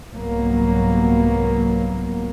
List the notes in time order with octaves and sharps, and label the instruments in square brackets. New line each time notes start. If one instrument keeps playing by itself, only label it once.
[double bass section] C2 G#2 F#3 A#3 B3